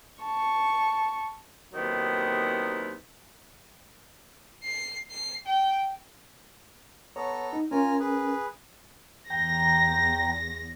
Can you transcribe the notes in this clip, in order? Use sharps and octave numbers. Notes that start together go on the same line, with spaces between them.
A5 C#6
D#2 C3 D#3 F#3 B3 E4
C7
C7
G5
B3 A4 C#5 A#5
D#4
C#4 F4 A#4 G#5 A#5
G#4 B4
E2 G5 A#5 A#6